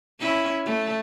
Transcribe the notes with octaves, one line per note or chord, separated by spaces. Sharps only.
C#4 E4
A3